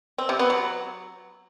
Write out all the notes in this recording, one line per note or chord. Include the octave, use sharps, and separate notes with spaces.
C4
C3
B3
F#3